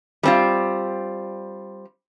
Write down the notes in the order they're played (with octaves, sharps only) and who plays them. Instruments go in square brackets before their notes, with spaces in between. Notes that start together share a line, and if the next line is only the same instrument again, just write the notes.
[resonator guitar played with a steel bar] G3 C4 F4